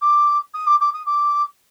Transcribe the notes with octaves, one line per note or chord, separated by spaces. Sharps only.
D6
D#6
D6
D6
D#6
D6